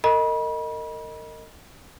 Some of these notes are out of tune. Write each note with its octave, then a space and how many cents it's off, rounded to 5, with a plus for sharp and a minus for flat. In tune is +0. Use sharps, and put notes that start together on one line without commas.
A#4 -35 D#5 +0 B5 -35